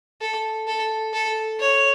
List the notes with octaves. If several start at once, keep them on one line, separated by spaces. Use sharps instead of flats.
A4
A4
A4
C#5